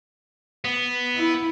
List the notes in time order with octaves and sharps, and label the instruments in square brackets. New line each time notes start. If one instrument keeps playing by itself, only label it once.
[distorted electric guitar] B3
[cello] E4